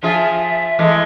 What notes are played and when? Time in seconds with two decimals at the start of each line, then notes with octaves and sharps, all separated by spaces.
0.03 F3 F4 G#4 E5
0.79 E3 G#3 A3